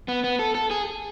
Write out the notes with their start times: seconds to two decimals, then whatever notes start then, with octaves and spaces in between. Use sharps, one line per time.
0.08 B3
0.24 B3
0.39 A4
0.55 A4
0.71 G#4